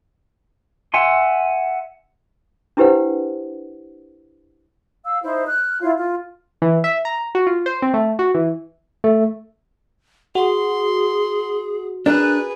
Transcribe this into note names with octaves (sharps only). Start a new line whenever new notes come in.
E5 F#5 G#5 C6
D4 E4 G4 B4 C5 F#5
F5 E6
D#4 E4 C5
F6 F#6
E4 F4 C#5 F5
F4
E3
E5
A#5
F#4
F4
C5
C4
A3
F#4
E3
A3
F#4 G#4 C6
D4 G#4 A#4 B4 F#6